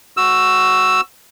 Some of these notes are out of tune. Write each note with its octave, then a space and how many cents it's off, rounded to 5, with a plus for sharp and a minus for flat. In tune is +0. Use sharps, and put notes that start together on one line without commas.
F#4 +0 E6 +5